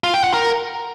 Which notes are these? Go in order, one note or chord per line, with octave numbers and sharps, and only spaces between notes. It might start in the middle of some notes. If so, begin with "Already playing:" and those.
F4
G5
F#5
A#4